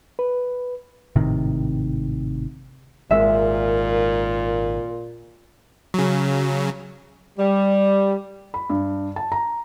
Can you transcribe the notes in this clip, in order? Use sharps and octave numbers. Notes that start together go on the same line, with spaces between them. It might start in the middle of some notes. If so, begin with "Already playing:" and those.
B4
G#1 A2 C3 D#3
G#1 A#2 G#3 A#4 E5
C#3 F#3
G3
B5
G2
A5
A#5